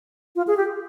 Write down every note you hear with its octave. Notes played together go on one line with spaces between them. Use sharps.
F4
G#4
G4